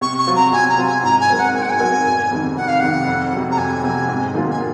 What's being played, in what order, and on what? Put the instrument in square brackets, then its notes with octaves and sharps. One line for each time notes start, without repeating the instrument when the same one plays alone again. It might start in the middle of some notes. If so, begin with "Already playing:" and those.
[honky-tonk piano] C3 [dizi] C#6
[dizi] C#6
[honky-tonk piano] F#3 C4 F4
[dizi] A#5
[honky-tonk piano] C3 [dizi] G#5
[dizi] A#5
[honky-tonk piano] F#3 C4 F4
[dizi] G#5
[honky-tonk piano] G#2 [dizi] A#5
[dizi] G#5
[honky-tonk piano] F#3 C4 F#4 A#4
[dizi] F#5
[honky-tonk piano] G#2 [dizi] G#5
[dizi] F#5
G#5
[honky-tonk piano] F#3 C4 F#4 A#4
F1
F2 C3 D#3
[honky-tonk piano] F1 [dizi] F#5
[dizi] F5
[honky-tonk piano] F2 C3 D#3 [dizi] F#5
[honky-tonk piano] F2
C3 F#3
[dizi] A#5
[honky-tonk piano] F2 [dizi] G#5
[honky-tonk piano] C3 F#3
G#2
D#3 F#3 A#3 F4
[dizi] G#5